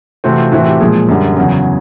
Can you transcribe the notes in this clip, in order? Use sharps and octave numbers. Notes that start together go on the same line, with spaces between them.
C3 E3 A3 C4 F#4
F4
A2 E3 A3 C4 F#4
G4
A#2 F3 G#3 G#4
F#2 D3 G3
E2 C#3 F#3